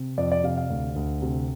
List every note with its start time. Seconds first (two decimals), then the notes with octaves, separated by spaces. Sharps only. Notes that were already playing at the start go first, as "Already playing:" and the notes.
Already playing: C3
0.18 F2 D5
0.32 D5
0.44 C3 F5
0.57 F5
0.70 D2
0.96 D2
1.22 C3